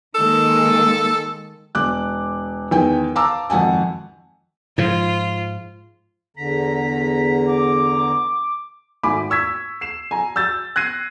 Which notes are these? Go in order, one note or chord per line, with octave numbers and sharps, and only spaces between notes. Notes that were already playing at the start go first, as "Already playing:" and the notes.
D#3 G#3 A#3 A4
E1 D6 F#6
E2 D#3 G5 G#5
F5 A5 A#5 D6 E6
G#1 F2 F#5 G#5 A5
G#2 F3 F4
E2 D3 A#5 B6
D6
G#1 A3 G#5 B5 D6
C#6 E6 G#6 B6
C7 E7
G#5 A#5
E6 G6 A6
F#6 G#6 A#6 C7 D#7